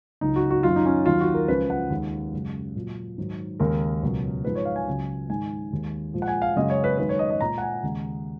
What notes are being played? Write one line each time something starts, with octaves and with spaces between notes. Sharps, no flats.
C#2 C#3 F#3 D#4
F#4
F#4
F#2 D#3 F#3 F4
D#4
C#4
D#2 D#3 F#3 F4
F#4
A#4
C#2 C#3 F3 G#3 B4
F#5
D#2 D#3 G#3
F#2 C#3 G#3
A#2 F#3
G#2 D#3 F#3
D#2 C#3 G#3 A#4
C#2 B2 F#3
G#2 F3 G#3 B4
C#5
F5
G#5
C#2 C#3 F#3
G#2 D#3 G#3 G#5
D#2 D#3 G#3
A#2 F3 G#3
F#5
G#5
F5
F#2 C#3 G#3 D#5
C#5
B4
F#2 D#3 G#3 B4
C#5
D#5
D#5
A#2 G#3 A#5
F#5
G#5
D#2 C#3 G#3